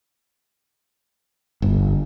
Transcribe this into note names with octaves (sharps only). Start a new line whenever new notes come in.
G1